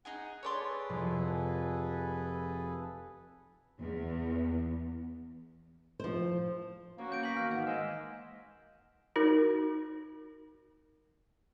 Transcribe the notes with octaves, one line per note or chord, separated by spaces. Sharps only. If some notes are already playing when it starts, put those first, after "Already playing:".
D#4 G#4 F#5 G#5
G#4 A4 B4 C#5 D5 C6
F1
E2
F3 C5
A#3 B3 C#4 F#4 C#5
G6 D7
F5 G#5 A#6 B6 F#7
D#3 E3 F6
G#2 F#5
G#3 A#3 G#5 E6
D#4 F#4 A#4